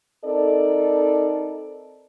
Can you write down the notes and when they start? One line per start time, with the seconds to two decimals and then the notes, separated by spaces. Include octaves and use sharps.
0.24 C4 D#4 A4 A#4 D5